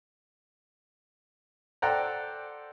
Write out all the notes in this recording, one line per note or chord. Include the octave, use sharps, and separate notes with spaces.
A4 C5 D5 F#5 G5 A#5